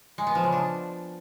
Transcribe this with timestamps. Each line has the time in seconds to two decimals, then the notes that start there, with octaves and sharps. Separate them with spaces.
0.18 G#3
0.27 B3
0.35 F3
0.44 C#3
0.52 D4